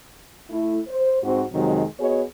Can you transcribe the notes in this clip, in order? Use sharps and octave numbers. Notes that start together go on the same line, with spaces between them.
A3 E4
C5
G#2 C4 F#4
F2 C3 D#3 F#3 G#3
B3 F#4 G#4 C#5 D#5